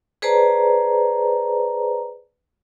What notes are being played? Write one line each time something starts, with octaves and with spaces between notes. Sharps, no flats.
G#4 B4 C5 D5 A5 A#5